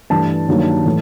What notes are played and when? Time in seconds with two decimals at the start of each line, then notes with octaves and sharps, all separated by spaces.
0.10 G2 E3 A3 A5
0.48 G2 D#3 F#3 A#3
0.86 A2 E3 A3